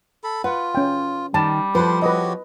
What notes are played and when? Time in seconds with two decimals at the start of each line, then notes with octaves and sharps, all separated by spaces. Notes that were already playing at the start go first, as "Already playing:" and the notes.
0.24 A4 B5
0.44 F4 B4 F#5
0.75 C#4 G5
1.34 D#3 G3 A5
1.75 F3 A4 B4 C5
2.02 F#4 G4 B4 C#5 D#5